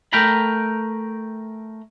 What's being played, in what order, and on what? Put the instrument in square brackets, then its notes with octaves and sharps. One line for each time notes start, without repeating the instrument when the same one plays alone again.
[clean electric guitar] A3 A#4 G5 A#5 B5